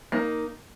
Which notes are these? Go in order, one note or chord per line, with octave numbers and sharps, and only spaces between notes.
A#3 D#4